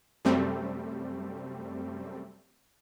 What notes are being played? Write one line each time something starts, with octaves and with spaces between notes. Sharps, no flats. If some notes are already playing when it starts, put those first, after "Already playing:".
F#2 C3 G3 A3 C4